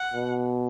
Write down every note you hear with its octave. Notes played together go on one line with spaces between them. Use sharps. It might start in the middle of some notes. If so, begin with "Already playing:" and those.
Already playing: F#5
B2